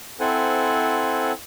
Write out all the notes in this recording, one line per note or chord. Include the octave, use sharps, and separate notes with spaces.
C4 E4 A4 C5 F#5 G#5